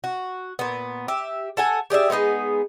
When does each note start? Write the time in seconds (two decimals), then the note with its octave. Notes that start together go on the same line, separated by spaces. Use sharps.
0.04 F#4
0.59 A#2 B3
1.08 G4 E5
1.57 A4 F#5 G#5
1.90 G4 G#4 D5 E5
2.10 G#3 B3 D#4 G#4